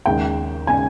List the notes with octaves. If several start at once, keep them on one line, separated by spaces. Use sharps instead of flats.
D#2 C#3 G#3 G5
C#3 G#3 G#5